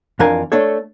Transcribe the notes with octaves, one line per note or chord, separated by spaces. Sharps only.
F2 E3 D4 A#4 F5 G#5
A3 D4 A4 C#5